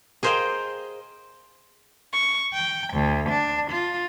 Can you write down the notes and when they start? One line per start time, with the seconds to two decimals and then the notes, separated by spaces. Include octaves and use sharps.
0.23 G#4 A#4 C5 D#5 F5 G5
2.13 C#6
2.53 G5
2.92 D2
3.29 D4
3.69 F4